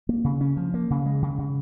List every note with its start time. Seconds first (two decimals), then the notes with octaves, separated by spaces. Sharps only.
0.09 A#3
0.24 C#3
0.41 C#4
0.57 F3
0.74 A#3
0.90 C#3
1.06 G#3
1.22 C#3
1.38 C#3